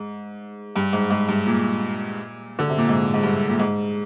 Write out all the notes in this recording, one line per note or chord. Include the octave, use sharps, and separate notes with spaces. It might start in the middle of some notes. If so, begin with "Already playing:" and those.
Already playing: G#2
G2
G#2
G#2
G2
A#2
D3
C3
A#2
G#2
G#2
G2
A#2
G#2